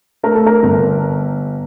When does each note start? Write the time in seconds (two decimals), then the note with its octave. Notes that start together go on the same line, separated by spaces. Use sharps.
0.23 A3 A#4
0.35 A4
0.46 A#4
0.63 G1